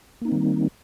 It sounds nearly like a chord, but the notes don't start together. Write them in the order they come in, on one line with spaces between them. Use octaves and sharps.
A#3 D#4 C4 D#3 G3